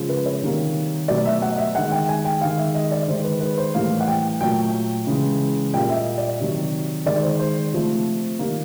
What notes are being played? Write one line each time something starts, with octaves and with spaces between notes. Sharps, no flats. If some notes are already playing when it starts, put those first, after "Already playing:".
Already playing: C#3 F3 G#3
B4
C#5
C3 D#3 G3 A#3
B2 F#3 A3 D5
E5
F#5
D#5
E5
D#3 G#3 F#5
G5
G#5
G5
D#3 G#3 F5
E5
D#5
D5
D#3 G#3 C5
B4
B4
C5
A2 E3 G3 A#3 F5
F#5
G5
A#2 F#3 A3 G5
C#3 E3 G#3
A#2 G3 A#3 G5
E5
D#5
D5
C3 D#3 F#3
D#3 G#3 D5
C5
C5
C3 F3 A3
D#3 G3 A#3